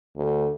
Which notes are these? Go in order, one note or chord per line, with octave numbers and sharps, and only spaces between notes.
D2